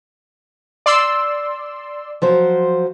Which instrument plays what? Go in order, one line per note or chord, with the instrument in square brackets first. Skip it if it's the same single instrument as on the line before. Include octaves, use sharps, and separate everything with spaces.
[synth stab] D5 C6 E6
[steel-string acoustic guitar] F3 F#3 C5